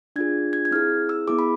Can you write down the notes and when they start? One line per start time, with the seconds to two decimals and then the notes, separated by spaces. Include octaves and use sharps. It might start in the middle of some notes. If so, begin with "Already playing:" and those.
0.16 D4 F4 G#4 G#6
0.53 G#6
0.65 G#6
0.71 C4 E4 G#4 F6
1.09 E6
1.27 B3 E4 G#4 D6
1.39 B5